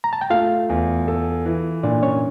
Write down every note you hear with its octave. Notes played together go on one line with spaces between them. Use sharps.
A#5
A5
G5
A3 F4 F5
E2
A4
E3
A#2 D4 D5
C#4 C#5